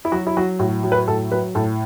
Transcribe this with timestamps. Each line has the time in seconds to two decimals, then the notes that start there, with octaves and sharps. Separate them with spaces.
0.05 E4
0.12 F#3 F#4
0.27 E4
0.37 F#3 F#4
0.59 A2 F#4
0.83 F#3
0.92 B4
1.08 A2 A4
1.32 F#3 B4
1.55 A2 A4